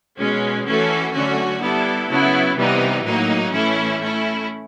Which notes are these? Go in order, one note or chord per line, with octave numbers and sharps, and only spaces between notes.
B2 G#3 C#4
E3 A3 C#4 F#4 A4
D3 F#3 A3 C#4 F#4
G3 B3 E4 A4
C#3 F#3 B3 E4
C3 E3 G3 B3 D#4
A2 F#3 A#3 D#4
A2 E3 A3 C#4 E4
A3 C#4 E4